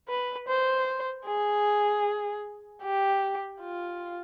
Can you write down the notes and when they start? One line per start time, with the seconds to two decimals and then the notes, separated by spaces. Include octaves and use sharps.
0.09 B4
0.48 C5
1.26 G#4
2.83 G4
3.60 F4